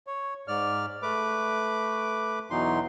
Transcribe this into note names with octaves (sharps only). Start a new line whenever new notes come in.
C#5
G#2 D5 F6
A3 B4 D6
E2 B2 E3 F#3 D#4 C6